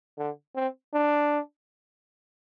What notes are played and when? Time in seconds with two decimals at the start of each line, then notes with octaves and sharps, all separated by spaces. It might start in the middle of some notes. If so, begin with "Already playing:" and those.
0.18 D3
0.55 C4
0.94 D4